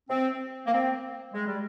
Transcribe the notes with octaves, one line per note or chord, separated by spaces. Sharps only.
C4
A#3
C4
G#3
G3